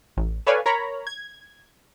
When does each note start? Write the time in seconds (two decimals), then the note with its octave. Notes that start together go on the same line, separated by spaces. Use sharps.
0.17 A1
0.47 A4 B4 C#5 D5 F5 G#5
0.66 A#4 C#5 A#5 B5
1.07 G#6